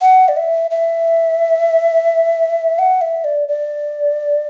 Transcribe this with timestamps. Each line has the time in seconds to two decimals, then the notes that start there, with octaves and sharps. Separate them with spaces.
0.02 F#5
0.28 D5
0.37 E5
0.71 E5
2.79 F#5
3.01 E5
3.24 D5
3.48 D5